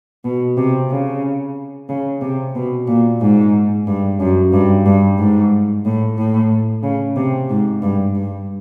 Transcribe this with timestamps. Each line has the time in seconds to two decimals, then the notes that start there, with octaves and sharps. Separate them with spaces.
0.25 B2
0.57 C3
0.90 C#3
1.89 C#3
2.22 C3
2.55 B2
2.87 A#2
3.21 G#2
3.86 G2
4.20 F#2
4.52 G2
4.86 G2
5.18 G#2
5.85 A2
6.18 A2
6.83 C#3
7.16 C3
7.49 G#2
7.82 G2
8.15 G2